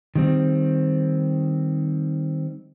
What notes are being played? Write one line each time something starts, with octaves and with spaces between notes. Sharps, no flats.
D#3 G3 C4